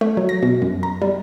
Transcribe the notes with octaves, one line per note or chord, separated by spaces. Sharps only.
A3
F#3
A#6
B2
F#2
A#5
G3